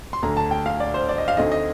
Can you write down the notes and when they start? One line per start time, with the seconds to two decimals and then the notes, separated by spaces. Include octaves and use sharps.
0.13 C6
0.23 D2 D3 A3 A#5
0.37 A5
0.51 G5
0.66 F5
0.80 D5
0.94 C5
1.09 D5
1.18 D#5
1.28 F5
1.37 D2 D3 A3 C4 D#4 D#5
1.52 D#5